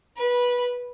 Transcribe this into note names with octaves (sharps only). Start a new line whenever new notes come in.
B4